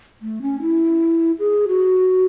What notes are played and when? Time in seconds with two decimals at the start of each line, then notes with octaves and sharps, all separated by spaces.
0.22 A3
0.42 C#4
0.61 E4
1.39 G#4
1.68 F#4